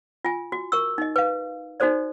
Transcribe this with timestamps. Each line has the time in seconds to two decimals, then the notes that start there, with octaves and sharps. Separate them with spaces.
0.25 F4 G#5
0.52 F#4
0.72 A#4 C#6 E6
0.98 D#4 D#5
1.16 B4 F5
1.80 D#4 F#4 A4 C5 D5